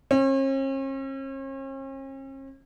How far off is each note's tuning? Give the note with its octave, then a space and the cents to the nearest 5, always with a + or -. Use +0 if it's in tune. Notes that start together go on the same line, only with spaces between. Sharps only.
C#4 -45